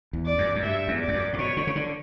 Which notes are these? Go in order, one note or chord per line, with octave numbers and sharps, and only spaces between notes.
E2
D5
F#2
F#2
G2 E5
E2
D5
E2
F#2
A2
B2 C#5
D3
C#3
D3